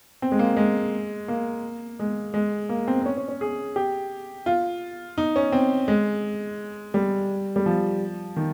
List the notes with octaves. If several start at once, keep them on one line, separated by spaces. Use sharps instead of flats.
C4
G#3
A#3
G#3
A#3
G#3
G#3
A#3
C4
C4
C#4
C#4
C#4
G#4
G4
F4
D#4
C#4
C4
G#3
G3
G3
F3
D#3